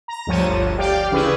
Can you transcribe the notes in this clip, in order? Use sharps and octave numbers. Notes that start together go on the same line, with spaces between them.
A#5
D2 G2 F3 C#5 A5 D#7
G1 D2
G4 D5 F5 G5
C#3 E3 C#4 E4 G#4 B4